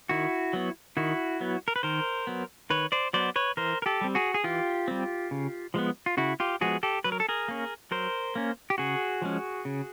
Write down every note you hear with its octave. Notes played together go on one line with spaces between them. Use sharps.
D#3 E4 F#4
F#3 B3
D#3 E4 F#4
F#3 B3
A#4
B4
D#3 A#4 C5
F#3 B3
D#3 B4 C#5
C5 D5
F#3 B3 C5 D5
B4 C#5
E3 A#4 C5
A#4
G4 A4
G3 C4
F#4 G#4
G#4
E3 F4 G4
G3 C4
C#3
F3 G#3 B3
F4
C#3 E4 F#4
F4 G4
F3 G#3 B3 F#4 G#4
G4 A4
F#3 B4
A#4
A4
G#4 A#4
A#3 C#4
F#3 A#4 C5
A#3 C#4
G4
C#3 F#4 G#4
F3 G#3 C#4
C#3